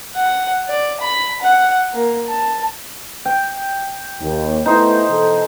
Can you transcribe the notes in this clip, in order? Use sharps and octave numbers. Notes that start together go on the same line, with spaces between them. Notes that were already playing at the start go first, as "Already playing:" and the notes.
F#5
D5
B5
F#5
A#3
A5
G5
D#2
A3 B3 D#4 E4 C5
B2 E3 A4